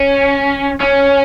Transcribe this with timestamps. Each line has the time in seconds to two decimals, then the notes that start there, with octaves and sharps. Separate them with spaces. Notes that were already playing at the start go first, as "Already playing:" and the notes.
Already playing: C#4
0.81 C#4